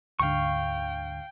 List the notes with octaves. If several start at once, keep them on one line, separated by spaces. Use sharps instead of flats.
D2 G#2 D3 F5 G5 C#6